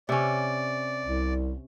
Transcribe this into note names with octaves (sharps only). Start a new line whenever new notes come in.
C3 C#4 D5
C2